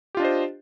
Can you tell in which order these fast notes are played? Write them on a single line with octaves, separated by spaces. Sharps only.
G4 F4 D4 D#5 C5